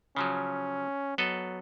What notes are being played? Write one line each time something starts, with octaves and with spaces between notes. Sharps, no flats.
C#3 F3 F#3 C#4
F#3 B3 A4 D#5